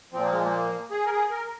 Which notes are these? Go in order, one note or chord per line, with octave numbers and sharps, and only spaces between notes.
A#2 F3 C4
A#3
G#3
A#3
G#4
A#4
G#4
A#4